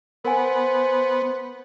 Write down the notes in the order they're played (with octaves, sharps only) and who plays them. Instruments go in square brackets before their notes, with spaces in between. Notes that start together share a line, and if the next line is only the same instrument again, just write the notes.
[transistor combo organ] B3 [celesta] A#4 F#5 G#5 [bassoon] C5